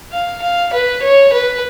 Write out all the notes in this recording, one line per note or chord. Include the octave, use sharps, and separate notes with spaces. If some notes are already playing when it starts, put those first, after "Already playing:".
F5
F5
B4
C#5
B4